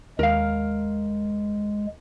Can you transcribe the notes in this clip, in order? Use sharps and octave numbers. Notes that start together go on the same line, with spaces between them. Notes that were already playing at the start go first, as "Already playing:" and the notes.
D#2 G#3 A#4 F5